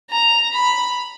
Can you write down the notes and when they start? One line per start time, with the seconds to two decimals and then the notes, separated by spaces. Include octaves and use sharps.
0.10 A#5
0.52 B5